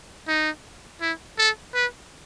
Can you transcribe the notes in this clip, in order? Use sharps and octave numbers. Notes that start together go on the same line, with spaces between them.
D#4
E4
A4
B4